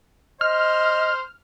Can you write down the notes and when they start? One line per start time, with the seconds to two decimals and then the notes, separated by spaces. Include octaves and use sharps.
0.41 C5 D#5 F6